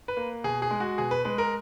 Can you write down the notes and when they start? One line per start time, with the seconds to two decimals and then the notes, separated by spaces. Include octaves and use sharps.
0.08 B4
0.17 A#3
0.44 B2 G#4
0.62 G#4
0.71 G#3
0.80 F#4
0.98 B2 G#4
1.11 B4
1.25 G#3 B4
1.38 A#4